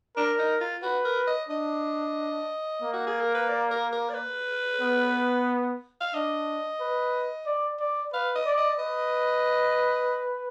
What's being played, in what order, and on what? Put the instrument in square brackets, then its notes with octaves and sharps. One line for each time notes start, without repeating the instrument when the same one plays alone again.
[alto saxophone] D4 [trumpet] A#4
[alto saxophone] D#4
F4
[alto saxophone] F#4 [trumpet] B4
[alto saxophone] A#4
D#5
[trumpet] D4 [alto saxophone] D#5
[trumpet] A#3
[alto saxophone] F#4
G#4
A#4
B4
D5
A#4
A#4
D5
B4
[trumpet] B3
[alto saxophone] F5
[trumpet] D4 [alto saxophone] D#5
[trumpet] B4
D5
D5
[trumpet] B4 [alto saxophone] F5
[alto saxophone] D#5
[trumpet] D5
[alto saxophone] D#5
[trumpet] B4 [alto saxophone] D#5